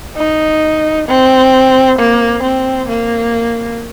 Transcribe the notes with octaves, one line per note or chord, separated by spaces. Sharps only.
D#4
C4
A#3
C4
A#3